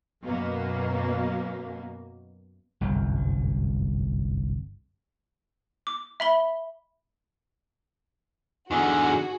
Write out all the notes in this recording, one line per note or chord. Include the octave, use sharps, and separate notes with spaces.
F#2 B2 A#3
G1 C2 F#2
D6
E5 B5 G7
E2 D3 D#4 F#4 G#4 G#5